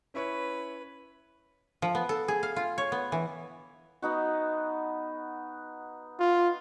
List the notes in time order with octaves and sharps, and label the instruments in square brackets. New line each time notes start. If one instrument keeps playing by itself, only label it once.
[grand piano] C#4 E4 C#5 [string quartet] B4
[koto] F3
B3
A4
G#4
F5
F4
C#5
B3
E3
[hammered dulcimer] B3 D#4 F#4
[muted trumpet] F4